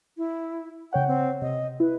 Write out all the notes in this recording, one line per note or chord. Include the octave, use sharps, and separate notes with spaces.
E4
C#3 C#5 F#5 G5
C4
C3 D#5
E4 B4